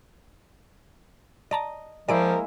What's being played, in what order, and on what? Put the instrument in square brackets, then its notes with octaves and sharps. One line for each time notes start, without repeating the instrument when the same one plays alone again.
[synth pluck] D5 A5 A#5 [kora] D#5
[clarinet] F3 [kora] G#3 A#3 E4 [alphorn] A#4 [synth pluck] D5 D7